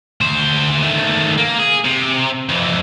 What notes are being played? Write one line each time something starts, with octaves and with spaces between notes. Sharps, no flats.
D2 C5
D#3 A3
A#3
G#4
C3
F2 E3